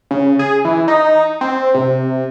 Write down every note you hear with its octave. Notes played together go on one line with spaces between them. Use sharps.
C#3
G#4
E3
D#4
C4
C3